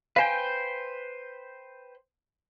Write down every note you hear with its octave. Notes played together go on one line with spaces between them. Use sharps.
B4 C5 F5 G5 G#5